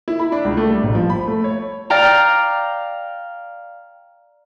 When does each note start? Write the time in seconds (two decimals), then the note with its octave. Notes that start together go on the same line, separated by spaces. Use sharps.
0.08 E4
0.19 B5
0.32 D4
0.45 C#2
0.57 A3
0.70 G3
0.83 A1
0.95 F3
1.10 B5
1.27 A3
1.44 C#5
1.90 D5 F5 G5 A#5